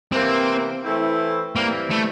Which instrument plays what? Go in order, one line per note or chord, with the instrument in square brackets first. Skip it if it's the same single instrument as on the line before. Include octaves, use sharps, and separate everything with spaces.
[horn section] C3 E3 A#3 [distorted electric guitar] C4
[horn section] E3 A3 C4 E4
[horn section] E3 G3 C4 E4 [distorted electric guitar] A#3
[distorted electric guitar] A3